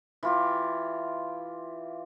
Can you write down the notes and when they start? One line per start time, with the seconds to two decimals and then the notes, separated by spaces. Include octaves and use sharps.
0.23 E3 F4 G4